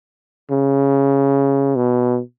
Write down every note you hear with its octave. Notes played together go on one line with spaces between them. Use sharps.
C#3
B2